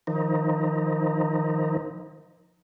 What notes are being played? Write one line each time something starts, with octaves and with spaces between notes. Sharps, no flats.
D#3 F3 D#4